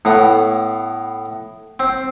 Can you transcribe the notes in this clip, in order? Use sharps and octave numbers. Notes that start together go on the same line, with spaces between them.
A2 B3
C4